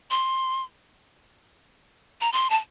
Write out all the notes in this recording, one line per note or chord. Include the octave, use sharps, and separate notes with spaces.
C6
A#5
C6
A5